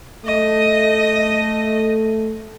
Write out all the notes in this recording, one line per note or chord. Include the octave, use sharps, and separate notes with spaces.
A3 D#5